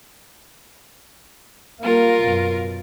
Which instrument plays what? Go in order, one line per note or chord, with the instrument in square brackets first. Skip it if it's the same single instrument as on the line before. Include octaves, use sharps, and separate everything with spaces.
[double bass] G3 A#3 [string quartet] F4 A#4
[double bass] F#2 B2